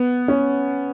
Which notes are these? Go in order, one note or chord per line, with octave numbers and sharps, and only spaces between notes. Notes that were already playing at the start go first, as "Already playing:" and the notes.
Already playing: B3
C#4